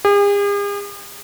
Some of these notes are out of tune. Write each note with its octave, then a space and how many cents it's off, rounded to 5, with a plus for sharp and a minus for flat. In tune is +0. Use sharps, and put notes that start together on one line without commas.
G#4 -45